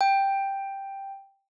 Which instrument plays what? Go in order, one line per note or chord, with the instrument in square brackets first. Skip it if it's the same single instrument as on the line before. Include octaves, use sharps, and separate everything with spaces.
[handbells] G5